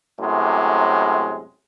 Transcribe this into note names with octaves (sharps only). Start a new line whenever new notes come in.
F#2 A2 C3 G#3